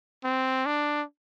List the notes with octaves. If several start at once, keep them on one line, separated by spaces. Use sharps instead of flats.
C4
D4